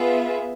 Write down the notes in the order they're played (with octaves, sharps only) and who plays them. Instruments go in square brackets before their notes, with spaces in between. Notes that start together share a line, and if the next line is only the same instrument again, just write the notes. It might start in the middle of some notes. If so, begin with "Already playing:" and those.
Already playing: [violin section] B3 F4 G#4 B4 E5